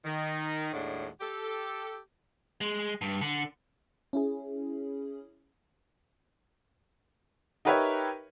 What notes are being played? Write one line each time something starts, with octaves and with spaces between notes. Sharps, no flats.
D#3
D#2 A2 G#3 D4 F#5
G4 A4
G#3
G2
D3
C#4 E4 G#4
D#4 G4 A#4 B4 C#5 E5